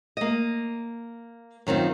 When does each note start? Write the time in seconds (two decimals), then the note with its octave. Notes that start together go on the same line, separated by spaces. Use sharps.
0.17 A#3 D#5
1.67 F#2 D#3 C4 F4